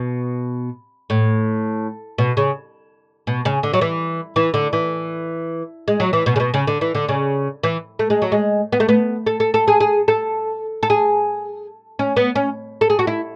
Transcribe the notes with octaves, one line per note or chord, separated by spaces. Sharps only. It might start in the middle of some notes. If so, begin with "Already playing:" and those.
Already playing: B2
A2
B2
C#3
B2
C#3
D3
F#3
E3
E3
D3
E3
G#3
F#3
E3
B2
C#3
B2
C#3
D3
E3
D3
C#3
E3
A3
G#3
F#3
G#3
B3
A3
B3
A4
A4
A4
G#4
G#4
A4
A4
G#4
C#4
B3
C#4
A4
G#4
F#4
E4